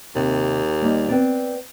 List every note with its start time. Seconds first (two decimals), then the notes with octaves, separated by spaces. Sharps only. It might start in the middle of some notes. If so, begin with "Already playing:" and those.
0.16 D#2 C3
0.82 G3 A#3 D#4
1.09 B3 C4 D5